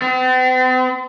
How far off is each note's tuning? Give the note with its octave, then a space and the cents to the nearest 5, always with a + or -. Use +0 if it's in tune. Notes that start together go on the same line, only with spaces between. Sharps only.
C4 -45